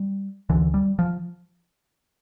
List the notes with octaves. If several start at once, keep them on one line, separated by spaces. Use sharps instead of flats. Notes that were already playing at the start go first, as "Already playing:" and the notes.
Already playing: G3
D2 D3 E3
G3
F3